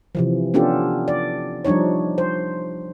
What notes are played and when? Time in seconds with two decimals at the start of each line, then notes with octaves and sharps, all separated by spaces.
0.15 C3 E3 F3
0.54 B3 C#4 D4 F4 G4 A4
1.08 D5
1.65 F3 G3 D4 D#4 C#5
2.18 C5